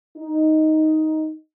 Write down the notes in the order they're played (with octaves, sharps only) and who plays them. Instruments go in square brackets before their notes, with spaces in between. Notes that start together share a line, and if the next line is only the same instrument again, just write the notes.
[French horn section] D#4